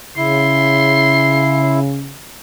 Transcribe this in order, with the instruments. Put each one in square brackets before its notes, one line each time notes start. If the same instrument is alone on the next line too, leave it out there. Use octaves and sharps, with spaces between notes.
[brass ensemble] C#3 [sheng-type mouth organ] E4 [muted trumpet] C6